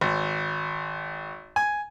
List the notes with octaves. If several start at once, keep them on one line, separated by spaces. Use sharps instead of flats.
G#1
G#5